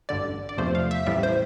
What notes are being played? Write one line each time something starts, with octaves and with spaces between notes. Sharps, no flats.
A1 G2 D3 D5
D5
E2 C3 F3 A3 C5
F5
E5
A1 A2 G3 E5
C5